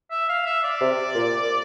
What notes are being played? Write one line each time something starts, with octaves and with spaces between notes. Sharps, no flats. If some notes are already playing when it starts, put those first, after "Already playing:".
E5
F5
E5
D5
C3
A#2